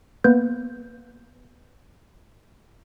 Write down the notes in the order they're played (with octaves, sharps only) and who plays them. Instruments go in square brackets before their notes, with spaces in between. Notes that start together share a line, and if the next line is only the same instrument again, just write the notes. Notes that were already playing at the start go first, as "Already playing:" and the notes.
[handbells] A#3 B3 B4 G6